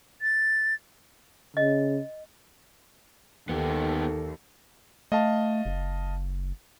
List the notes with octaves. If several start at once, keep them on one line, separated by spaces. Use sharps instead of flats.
A6
C#3 D#5
D#2 B3 D#4 G4 A4
A3 D#5 F5 A5
F#1